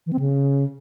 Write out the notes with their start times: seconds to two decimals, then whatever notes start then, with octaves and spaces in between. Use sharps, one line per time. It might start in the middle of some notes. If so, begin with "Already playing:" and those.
0.06 E3
0.13 C4
0.19 C#3